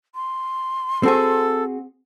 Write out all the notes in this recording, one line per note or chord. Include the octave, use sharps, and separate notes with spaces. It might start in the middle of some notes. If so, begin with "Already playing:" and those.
C6
C4 F#4 G#4 A4